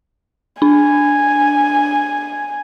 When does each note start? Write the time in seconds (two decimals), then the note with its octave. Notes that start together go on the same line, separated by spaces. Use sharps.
0.62 D4 G#5